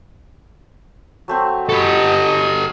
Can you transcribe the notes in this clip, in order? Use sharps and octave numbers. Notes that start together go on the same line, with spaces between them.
F#3 A3 C4
F#4 G4 A4 D#5 F#5 B5